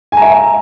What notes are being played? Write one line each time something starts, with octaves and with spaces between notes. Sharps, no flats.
E5 G#5 A#5